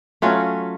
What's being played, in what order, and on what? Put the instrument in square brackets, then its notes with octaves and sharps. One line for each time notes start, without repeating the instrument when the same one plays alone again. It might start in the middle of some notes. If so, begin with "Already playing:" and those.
[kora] F#3 A3 C#4 F4